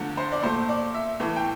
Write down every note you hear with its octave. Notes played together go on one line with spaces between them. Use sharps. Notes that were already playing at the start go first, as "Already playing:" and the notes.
Already playing: E2 D3 F3 A3
C5
D5
A#2 A3 C5
D5
E5
A2 E3 A3
G5